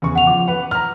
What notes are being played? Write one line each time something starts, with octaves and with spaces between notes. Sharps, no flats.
E2 C#3 C#6
F#5 F7
F3 D6
B4 F#5
A#5 F6